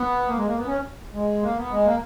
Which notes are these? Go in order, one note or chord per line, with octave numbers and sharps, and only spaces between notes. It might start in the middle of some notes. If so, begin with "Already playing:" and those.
Already playing: B3
A#3
G#3
A#3
B3
C#4
G#3
A#3
B3
G#3
A#3